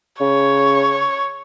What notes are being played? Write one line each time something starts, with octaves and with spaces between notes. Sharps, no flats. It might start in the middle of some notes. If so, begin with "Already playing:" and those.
C#3 C#5